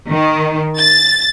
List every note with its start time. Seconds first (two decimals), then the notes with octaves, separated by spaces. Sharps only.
0.11 D#3
0.78 A6